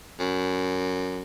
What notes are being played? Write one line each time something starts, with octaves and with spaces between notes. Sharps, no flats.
F#2